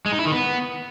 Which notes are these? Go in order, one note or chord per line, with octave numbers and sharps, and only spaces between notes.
G#3
D#4
E4
D#3
B3